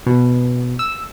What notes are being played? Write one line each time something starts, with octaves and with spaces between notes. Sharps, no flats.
B2
E6